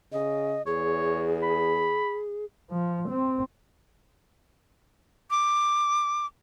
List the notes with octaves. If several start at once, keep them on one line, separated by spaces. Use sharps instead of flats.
C#3 D#5
E2 G#4 C#5
B5
F3
C4
D6